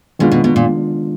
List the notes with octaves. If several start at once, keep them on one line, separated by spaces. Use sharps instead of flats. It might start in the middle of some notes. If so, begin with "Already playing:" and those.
B2 D#3 G#3 D4 F4
B2
B2
A#2